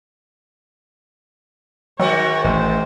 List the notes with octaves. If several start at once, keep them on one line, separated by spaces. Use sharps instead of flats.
G#2 D#3 F#3 F#4 C#5
A1 C5